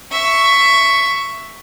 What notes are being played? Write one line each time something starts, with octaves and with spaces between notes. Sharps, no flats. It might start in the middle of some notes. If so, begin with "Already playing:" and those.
E5 C#6